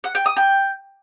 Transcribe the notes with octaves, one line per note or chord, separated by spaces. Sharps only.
F#5
G5
D#6
G5